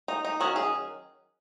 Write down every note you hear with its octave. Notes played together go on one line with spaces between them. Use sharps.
D#4
D#4
D#3 F#3 C#4 F#4
G#4